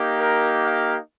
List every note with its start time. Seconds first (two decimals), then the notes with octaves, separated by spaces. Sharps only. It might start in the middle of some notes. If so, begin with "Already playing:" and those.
Already playing: A#3 D#4 G4
0.19 A#4
0.63 F5